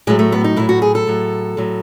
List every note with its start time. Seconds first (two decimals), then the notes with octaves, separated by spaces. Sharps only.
0.07 A2 F#3 G#3
0.19 A3
0.32 B3
0.44 D#4
0.56 A2 F#3 E4
0.69 F#4
0.82 G#4
0.95 A4
1.07 A2 F#3
1.57 A2 F#3